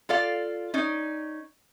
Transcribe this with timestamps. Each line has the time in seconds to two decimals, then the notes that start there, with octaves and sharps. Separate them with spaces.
0.09 F4 A4 D5 F5
0.74 C#4 D#4 D5